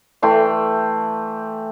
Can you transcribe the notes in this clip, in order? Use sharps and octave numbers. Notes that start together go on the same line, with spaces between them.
E3 A3 G5 C6